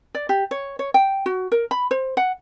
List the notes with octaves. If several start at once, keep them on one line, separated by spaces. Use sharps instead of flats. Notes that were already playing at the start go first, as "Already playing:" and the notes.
D5
G4
C#5
C#5
G5
F#4
A#4
B5
C5
F#5